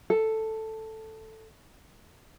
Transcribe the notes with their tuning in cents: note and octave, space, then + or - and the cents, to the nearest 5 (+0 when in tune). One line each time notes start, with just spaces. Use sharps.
A4 +5